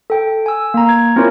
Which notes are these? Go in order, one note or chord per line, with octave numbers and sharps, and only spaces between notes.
A4 G5
G#5 E6
A#3 A#5
G#6
C4 C#4 E4 F4 A#4 C#5